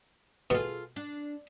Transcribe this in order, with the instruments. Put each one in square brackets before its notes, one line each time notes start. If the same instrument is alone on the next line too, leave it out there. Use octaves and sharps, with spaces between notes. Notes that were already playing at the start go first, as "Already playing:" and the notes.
[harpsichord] B2 [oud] F4 G#4 A4
[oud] D4